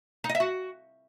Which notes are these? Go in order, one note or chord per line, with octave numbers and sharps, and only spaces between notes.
D#4
D#5
E5
F#4